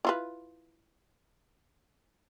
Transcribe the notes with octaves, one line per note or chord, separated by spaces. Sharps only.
E4 F4 B4